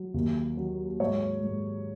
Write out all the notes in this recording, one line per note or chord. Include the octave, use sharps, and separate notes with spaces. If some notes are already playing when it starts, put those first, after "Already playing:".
Already playing: F#3
D#2
F#3
G#2 C#5
G#2